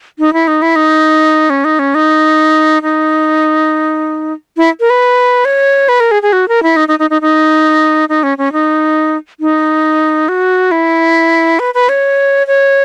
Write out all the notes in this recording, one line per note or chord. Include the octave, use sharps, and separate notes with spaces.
D#4
E4
D#4
E4
D#4
C#4
D#4
C#4
D#4
D#4
E4
A#4
B4
C#5
B4
A#4
G#4
G#4
F#4
A#4
E4
D#4
D#4
D#4
D#4
D#4
D#4
C#4
C#4
D#4
D#4
F#4
E4
B4
B4
C#5
C#5